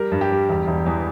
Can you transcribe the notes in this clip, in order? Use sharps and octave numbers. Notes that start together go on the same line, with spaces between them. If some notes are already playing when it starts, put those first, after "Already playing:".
Already playing: G3 A#4
G2
G4
G3
E1
E1
E2